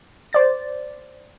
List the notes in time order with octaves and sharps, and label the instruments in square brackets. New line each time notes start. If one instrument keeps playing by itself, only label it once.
[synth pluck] C5 D5 A6